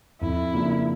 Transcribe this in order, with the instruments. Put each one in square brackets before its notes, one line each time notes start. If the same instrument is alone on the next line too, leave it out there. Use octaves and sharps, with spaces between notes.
[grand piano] F2 [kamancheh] E4
[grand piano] C#3 F3 A#3 D4